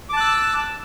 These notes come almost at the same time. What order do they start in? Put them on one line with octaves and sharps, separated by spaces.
D6 A5 F#6 E6